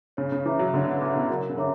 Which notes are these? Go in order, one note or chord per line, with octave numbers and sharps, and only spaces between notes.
C#3 C#5
C#3
E3 E5 A#5 D6
F#3
D3 C#5
C#3
C#3 E5 A#5 D6
B2
F#3 A#4
C#3
D3 C#5 E5 A#5 D6